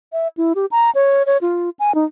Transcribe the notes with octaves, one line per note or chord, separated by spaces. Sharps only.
E5
E4
G4
A#5
C#5
C#5
F4
G#5
D#4